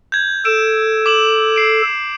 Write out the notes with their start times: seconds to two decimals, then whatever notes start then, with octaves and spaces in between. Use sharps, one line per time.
0.12 G6 G#6
0.45 A4 D7 E7
1.06 D6 E7 F#7
1.56 C7 D7